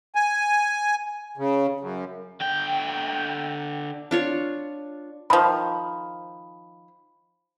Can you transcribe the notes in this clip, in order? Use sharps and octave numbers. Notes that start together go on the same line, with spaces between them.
G#5
C#3
F#2
D3 G5
D4 F4 C#5
D#3 F3 B5